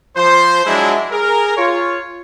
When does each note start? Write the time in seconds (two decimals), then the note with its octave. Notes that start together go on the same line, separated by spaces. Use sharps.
0.16 F3 C5
0.66 F#3 G#3 D4 E4
1.11 G#4 A#4
1.57 F4 C#5